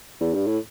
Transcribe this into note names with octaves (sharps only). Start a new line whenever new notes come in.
E2
G2
A2